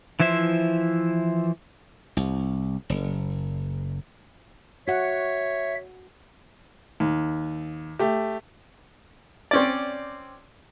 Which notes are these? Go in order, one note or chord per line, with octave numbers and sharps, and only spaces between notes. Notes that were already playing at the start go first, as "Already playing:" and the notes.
E3 F3 E4 C5 E5
C2
F#1
F#4 C#5 E5 F#5
D#2
A3 G4
C4 C#4 D5